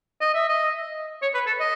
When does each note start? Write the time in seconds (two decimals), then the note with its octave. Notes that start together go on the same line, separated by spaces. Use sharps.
0.21 D#5
0.34 E5
0.49 D#5
1.22 C#5
1.34 B4
1.47 A4
1.60 D#5